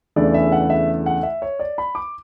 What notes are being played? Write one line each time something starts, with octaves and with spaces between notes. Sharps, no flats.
E2 C#3 E3 A3 D4 D5
E5
F#5
E5
F#5
E5
C#5
D5
B5
D6